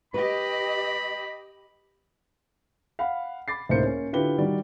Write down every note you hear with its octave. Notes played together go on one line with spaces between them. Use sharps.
G4 B4 D#5 B5
F5 F#5 B5
B5 D6 A6 C7
C#2 A2 A#3 D#4 C5 C#7
A#3 C#4
D3 E4 F4 G4 B4 G7
D#3 G3 F#4 D5